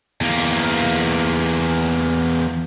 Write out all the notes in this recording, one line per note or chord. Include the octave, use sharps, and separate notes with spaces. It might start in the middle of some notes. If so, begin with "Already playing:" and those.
E2 A#3